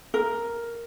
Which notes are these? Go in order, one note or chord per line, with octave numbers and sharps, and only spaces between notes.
A#4